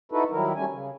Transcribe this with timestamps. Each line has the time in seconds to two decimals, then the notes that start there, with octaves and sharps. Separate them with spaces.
0.12 D#4 E4 F#4 A4 B4
0.31 D#3 F#3 G3 E4 A#4
0.56 G3 A3 C#4 G#5
0.71 C#3